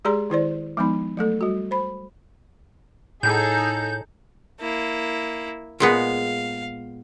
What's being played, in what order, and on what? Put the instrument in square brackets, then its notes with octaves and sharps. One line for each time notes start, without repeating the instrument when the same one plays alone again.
[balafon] G#3 G4 G#4 D5 A#5 C6
D#3 E4 C5 D5
F3 G#3 B3 D#4 B5
F#3 A3 A4
G3 F#4
C5 B5
[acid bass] A2 [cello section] D#4 G#4 A4 [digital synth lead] G6
[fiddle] A#3 E4
[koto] A#2 G#3 B3 [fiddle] F5